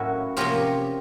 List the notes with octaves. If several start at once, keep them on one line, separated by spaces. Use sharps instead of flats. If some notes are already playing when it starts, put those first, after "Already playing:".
Already playing: A2 F#3 A#3 C#4 E4 F#4
C3 F3 A#3 C#4 F4 G4